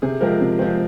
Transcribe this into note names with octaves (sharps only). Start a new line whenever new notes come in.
C3 G#4
F3 G#3 C4 A#4
C3
F3 G#3 C4